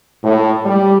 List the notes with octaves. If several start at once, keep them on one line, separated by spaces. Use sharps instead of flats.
A2
G3